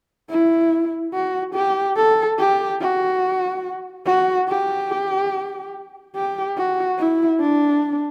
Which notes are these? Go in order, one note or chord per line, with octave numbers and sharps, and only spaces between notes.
E4
F#4
G4
A4
G4
F#4
F#4
G4
G4
F#4
E4
D4